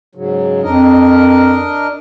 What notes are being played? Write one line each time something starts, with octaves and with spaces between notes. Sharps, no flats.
G#2 C#3 F#3
F2 D4 A#4 D#5